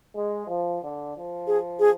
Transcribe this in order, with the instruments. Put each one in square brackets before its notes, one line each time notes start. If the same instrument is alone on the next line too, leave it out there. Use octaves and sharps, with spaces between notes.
[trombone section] G#3
F3
D3
F3
[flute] G#4
G#4